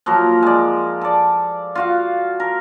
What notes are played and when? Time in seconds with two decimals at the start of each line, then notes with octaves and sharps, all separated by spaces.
0.06 F3 F#3 A#3 A#4
0.43 G#3 D5
1.01 A4 D5
1.75 F4 F#4 F5
2.40 A#4